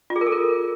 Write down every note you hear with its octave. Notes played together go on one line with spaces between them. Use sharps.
F4
G#4
A#4
A4
A#4